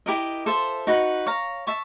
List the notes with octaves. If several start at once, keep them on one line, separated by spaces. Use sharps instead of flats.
E4 G4 A#4 D#5
F4 A4 C5 E5
D#4 F#4 B4
C#5 F5 A#5
E5 A5 C#6